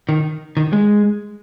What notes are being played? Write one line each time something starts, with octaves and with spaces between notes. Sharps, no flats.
D#3
D#3
G#3